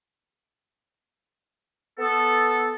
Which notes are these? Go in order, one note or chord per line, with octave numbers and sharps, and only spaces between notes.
B3 A4